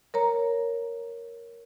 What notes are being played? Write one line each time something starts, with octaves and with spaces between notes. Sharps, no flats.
A#4 C#5 A#5